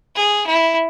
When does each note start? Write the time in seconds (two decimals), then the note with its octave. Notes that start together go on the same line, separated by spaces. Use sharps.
0.16 G#4
0.47 E4